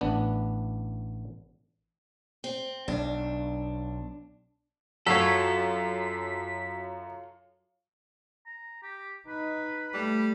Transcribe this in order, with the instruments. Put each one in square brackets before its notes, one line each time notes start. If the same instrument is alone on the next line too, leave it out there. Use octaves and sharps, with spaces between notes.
[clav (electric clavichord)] A1 B3 D4
[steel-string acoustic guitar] C4
[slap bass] B1 [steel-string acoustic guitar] D4
[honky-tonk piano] F#2 [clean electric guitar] F4 A4 [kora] F#4 C#5 [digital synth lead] B6
[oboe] A#5
G4
[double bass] D#4 [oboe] B4
[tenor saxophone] G3 [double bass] A3